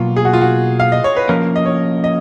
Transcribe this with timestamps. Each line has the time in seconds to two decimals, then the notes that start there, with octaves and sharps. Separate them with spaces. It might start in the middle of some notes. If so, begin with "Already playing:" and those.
Already playing: B2 F#3 A#3 F4
0.16 G#4
0.25 F#4
0.33 F4
0.41 F#4
0.80 F5
0.92 D#5
1.04 C#5
1.16 B4
1.29 F3 A#3 C#4 A#4
1.56 D#5
1.66 C#5
2.04 D#5